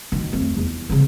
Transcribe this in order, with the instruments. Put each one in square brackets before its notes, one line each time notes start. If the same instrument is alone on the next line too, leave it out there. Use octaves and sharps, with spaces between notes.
[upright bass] F#2 D#3
F2 A3
E2
C#3 C4